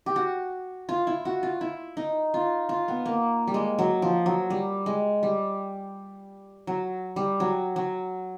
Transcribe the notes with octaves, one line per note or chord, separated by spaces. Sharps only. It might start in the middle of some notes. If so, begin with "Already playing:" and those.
G4
F#4
F4
E4
F#4
F4
E4
D#4
F4
F4
B3
A#3
G3
G#3
F#3
F3
F#3
G3
G#3
G3
F#3
G3
F#3
F#3